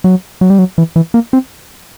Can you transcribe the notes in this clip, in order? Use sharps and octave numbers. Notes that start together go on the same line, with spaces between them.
F#3
F#3
G3
F#3
E3
E3
A#3
C4